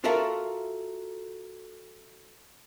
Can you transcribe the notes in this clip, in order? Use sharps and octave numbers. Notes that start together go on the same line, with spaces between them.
F4 F#4 A4 A#4 E5 F5